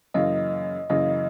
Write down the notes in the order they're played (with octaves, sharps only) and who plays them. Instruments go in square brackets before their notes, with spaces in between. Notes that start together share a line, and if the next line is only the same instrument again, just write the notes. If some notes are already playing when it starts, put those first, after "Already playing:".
[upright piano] F#2 C#3 E3 A#3 [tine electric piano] D#5
[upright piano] F#2 C#3 E3 A#3 [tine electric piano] D#5